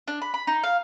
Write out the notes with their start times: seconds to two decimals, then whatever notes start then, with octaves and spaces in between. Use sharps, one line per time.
0.08 D4
0.22 B5
0.34 B5
0.47 D#4
0.63 F5